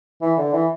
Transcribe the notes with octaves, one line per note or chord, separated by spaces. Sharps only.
E3
D3
E3